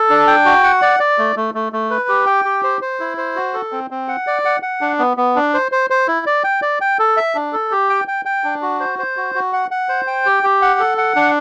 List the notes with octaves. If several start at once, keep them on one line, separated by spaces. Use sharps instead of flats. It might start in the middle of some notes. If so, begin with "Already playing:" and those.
Already playing: A4
D4
G5
F#4
F#5
D5
D5
A3
A3
A3
A3
B4
G4
G5
G4
C5
C5
E4
C5
F#4
A4
C4
C4
F#5
D5
F#5
F#5
D4
B3
B3
D4
C5
C5
C5
E4
D5
G5
D5
G5
A4
E5
D4
A4
G4
G5
G5
G5
D4
F#4
C5
C5
F#4
F#4
F#5
F#5
C5
G5
G4
G4
F#5
A4
F#5
D4